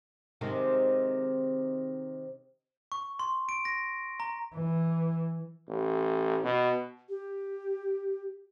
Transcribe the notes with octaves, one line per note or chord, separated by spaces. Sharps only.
C3 D#3 G#3
C#6
C6
D7
A#6
A#5
E3
A1
B2
G4